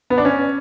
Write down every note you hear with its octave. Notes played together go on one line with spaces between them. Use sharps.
B3
D4
C#4